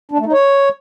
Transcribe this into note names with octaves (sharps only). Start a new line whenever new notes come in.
D4
A3
D#4
C#5